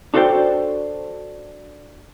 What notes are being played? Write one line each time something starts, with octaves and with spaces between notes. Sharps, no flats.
D4 F#4 A4 C5 D5 G5